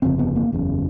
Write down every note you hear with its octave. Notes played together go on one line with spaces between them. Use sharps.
G1 F2 C#3 C4
B3
A#3
F#1 E2 C#3